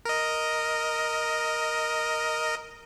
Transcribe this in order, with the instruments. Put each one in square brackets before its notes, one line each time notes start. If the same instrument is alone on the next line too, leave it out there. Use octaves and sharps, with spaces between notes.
[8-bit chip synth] A#4 D#5